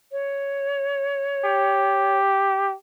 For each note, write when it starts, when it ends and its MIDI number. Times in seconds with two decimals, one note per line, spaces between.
0.12 2.17 73
1.45 2.75 67